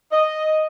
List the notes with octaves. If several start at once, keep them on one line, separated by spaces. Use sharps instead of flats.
D#5